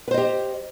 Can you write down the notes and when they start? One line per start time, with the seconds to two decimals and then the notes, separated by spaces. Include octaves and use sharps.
0.08 B4
0.11 C5
0.14 D#5
0.18 G4